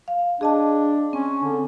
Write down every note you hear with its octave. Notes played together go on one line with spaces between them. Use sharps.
F5
D4 G#4 D#5 A5
C4 C#4
D3